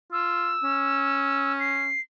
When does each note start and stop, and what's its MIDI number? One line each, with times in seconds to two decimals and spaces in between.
0.12 0.54 65
0.12 1.53 88
0.64 1.95 61
1.60 2.01 96